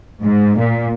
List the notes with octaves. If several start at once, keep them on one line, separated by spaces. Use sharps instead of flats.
G#2
A#2